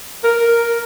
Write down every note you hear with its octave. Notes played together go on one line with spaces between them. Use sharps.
A#4